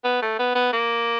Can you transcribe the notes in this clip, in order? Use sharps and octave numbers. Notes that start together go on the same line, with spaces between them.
B3
A3
B3
B3
A#3